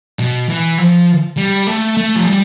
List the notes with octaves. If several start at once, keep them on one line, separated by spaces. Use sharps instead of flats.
B2
E3
F3
G3
A3
A3
F3
G3